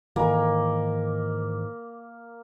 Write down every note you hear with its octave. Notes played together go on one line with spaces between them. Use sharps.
G#2 D#3 E3 A#3